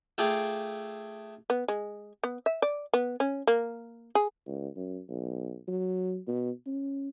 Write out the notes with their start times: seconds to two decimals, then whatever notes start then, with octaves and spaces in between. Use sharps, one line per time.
0.18 A3 F4 G#4 D5 F5 G5
1.50 B3
1.68 G#3
2.24 B3
2.46 E5
2.62 D5
2.93 B3
3.20 C#4
3.47 A#3
4.15 G#4
4.47 C#2
4.76 F#2
5.09 B1
5.68 F#3
6.27 B2
6.66 C#4